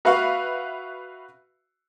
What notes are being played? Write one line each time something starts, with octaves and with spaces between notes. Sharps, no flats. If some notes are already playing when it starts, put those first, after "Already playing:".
F#4 B4 E5 F5 C#6